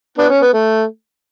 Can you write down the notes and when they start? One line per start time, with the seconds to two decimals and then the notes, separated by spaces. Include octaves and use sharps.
0.18 B3 D4
0.29 C#4
0.42 B3
0.53 A3